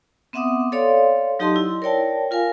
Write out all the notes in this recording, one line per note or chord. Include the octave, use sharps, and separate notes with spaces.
B3 C4 E5 F#5 D6 D#6
A4 C#5 D5 F5 C6
F#3 D#4 G4 D#5 A5 C6
E4
A#4 C#5 D5 G5 A5
F4 A#4 F5 G#5